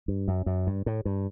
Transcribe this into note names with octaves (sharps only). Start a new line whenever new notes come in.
G2
F#2
F#2
G2
A2
G2